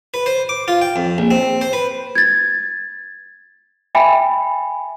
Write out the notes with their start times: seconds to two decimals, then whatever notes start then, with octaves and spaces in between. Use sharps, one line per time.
0.14 B4
0.26 C5
0.49 D6
0.68 F4
0.82 G5
0.96 F2
1.18 A#1
1.31 C4
1.61 C5
1.73 B4
2.15 G#6 A6
3.95 E5 G5 G#5 B5